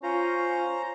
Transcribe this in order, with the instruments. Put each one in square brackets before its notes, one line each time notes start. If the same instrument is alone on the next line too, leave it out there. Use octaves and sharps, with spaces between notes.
[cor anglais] C#4 [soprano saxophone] F4 [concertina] C5 A#5